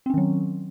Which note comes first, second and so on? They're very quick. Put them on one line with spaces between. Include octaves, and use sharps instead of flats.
C4 C#4 D#3 F#3